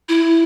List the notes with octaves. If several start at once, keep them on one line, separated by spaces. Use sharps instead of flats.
E4